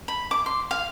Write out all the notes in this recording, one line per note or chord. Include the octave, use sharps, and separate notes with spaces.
B5
D6
C6
F5